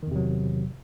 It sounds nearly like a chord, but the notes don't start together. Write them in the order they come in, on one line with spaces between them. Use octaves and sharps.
D#3 E2 C3 F#3